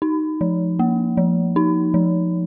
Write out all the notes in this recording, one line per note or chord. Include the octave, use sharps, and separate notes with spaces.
D#4
F3
A#3
F3
D#4
F3